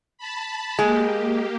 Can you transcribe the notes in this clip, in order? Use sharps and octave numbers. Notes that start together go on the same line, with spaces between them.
A5 B5
G#3 A#3 G4